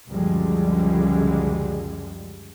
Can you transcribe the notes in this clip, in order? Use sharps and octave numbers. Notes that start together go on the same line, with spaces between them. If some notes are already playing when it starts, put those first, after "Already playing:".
C#2 F#2 D3 F3 G3 G#3